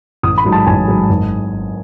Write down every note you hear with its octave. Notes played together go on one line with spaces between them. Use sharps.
A1 D#6
B5
G#2 F#3
A5
A1 G#5
G#2 F#3
G#1